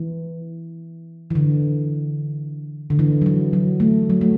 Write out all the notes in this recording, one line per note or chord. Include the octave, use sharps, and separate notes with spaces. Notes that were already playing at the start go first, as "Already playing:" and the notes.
Already playing: E3
E3
D3
D3
E3
F#3
E3
F#3
A3
F#3
A3